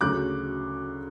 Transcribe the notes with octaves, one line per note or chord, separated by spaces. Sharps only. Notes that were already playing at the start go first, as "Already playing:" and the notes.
D2 C#3 F#3 C#4 D6 F#6